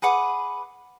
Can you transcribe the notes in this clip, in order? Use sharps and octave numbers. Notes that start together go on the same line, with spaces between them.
G#4 B4 F#5 D6